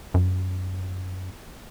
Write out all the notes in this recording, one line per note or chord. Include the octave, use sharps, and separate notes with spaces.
F#2